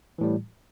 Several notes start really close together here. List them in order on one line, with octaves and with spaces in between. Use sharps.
E3 A2 G3